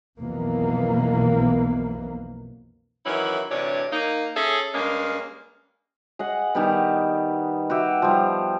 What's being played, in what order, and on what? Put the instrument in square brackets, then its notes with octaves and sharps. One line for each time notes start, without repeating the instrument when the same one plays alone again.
[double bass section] B1 F2 B2 E3 A#3 B3
[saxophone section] D#3 E3 F#3 C#4 E4
D2 C3 E3 D4 C#5
A#3 D#4
C#4 G#4 A4 C#5 E5
G2 G#3 A#3 C#4
[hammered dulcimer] G#4 D#5 F#5
D#3 G3 B3
F#4 G4 E5
F3 G3